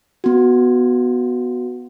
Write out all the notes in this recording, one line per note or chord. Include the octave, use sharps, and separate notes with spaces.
B3 F#4